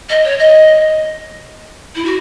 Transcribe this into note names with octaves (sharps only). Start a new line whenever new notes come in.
D#5
C#5
D#5
E4
F#4